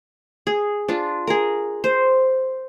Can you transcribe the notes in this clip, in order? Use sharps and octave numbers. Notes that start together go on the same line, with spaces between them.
G#4
D4 F4
G#4 A#4
C5